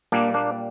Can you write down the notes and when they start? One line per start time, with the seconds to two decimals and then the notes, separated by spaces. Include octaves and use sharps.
0.12 A#2 G3 A#3 D4
0.34 A#3 D4